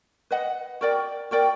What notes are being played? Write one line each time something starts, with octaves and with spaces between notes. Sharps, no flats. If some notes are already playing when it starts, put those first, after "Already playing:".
B4 D#5 F#5
F#4 A#4 D5 G5
F#4 A#4 D5 G5